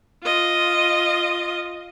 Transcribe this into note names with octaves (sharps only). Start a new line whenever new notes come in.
F4 D#5